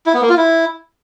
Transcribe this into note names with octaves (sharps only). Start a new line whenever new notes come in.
E4
B3
A#3
F4
E4